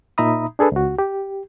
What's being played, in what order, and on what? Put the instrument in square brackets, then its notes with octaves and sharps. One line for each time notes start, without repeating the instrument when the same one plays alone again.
[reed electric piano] A#2 D#4 E5 A#5 B5 D#6
D4 G#4 A4 B4
C#2 F#4
G4